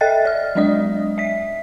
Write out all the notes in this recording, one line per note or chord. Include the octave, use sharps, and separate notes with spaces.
A4 D#5 E5 G5 F#6 A6
D5 F6
F#3 G#3 D4 D5 D#5 D#6
E5 B6